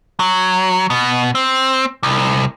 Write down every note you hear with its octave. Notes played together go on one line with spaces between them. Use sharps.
F#3
B2
C4
C2